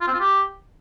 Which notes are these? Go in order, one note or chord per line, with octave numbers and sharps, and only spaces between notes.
F4
C4
F4
G4